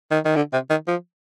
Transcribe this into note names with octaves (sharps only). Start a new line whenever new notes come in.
D#3
D#3
D3
C3
D#3
F3